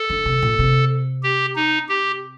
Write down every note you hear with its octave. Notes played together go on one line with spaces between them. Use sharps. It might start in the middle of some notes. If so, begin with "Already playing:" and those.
Already playing: A4
D3
C3
A#2
C3
G4
D#4
G4